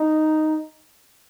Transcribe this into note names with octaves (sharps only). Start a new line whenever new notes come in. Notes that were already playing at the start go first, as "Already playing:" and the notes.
Already playing: D#4